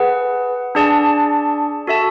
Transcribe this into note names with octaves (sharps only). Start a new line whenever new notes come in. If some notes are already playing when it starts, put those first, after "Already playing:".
Already playing: G#4 B4 F#5
D4 G#4 D5 A5
F#4 A4 E5 A5